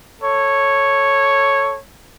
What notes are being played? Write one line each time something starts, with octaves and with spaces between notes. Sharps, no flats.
A4 C#5